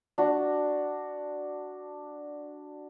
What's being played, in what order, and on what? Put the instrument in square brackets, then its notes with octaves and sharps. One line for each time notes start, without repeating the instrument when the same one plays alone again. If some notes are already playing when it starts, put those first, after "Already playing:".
[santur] D4 F#4